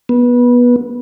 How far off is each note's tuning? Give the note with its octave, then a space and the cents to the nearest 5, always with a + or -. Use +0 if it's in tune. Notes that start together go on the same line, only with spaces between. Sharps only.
B3 -20